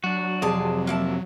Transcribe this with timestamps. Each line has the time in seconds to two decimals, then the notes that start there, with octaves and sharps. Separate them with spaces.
0.04 F#3 D4 F#4
0.42 F2 C3 G#4 D5 A5
0.87 A#3 E4 A5